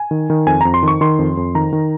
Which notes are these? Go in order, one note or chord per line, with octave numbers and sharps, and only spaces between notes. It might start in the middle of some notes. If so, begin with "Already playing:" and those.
Already playing: G#5
D#3
D#3
F2 G#5
F2 A#5
C6
D#3
C#6
D#3 C6
F2
F2
D#3 A#5
D#3